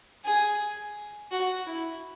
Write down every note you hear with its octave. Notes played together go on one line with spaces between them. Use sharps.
G#4
F#4
E4